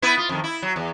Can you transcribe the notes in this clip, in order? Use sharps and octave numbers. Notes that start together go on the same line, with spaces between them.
B3 E4 B4
F4
F2 D#3
E4
F#3
E2